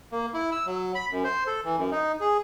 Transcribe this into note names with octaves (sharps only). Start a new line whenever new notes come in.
A#3
E4
E6
F#3
B5
F#2
C5
A4
E3
F#2
D#4
G#4